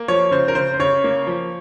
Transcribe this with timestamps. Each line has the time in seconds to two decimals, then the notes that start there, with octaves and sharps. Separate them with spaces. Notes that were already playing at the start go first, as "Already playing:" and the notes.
Already playing: A#3
0.08 F3 C#5
0.31 C#3 C5
0.48 A#4
0.55 C#3 C5
0.74 C5
0.79 C#3 C#5
1.04 A#3
1.27 F3